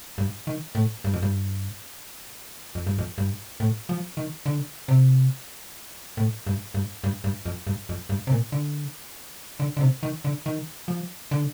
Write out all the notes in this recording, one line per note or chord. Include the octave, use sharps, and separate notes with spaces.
G2
D#3
A2
G2
F2
G2
F2
G2
F2
G2
A2
F3
D#3
D3
C3
A2
G2
G2
G2
G2
F2
G2
F2
G2
C3
A#2
D3
D3
D3
C3
D#3
D3
D#3
F3
D3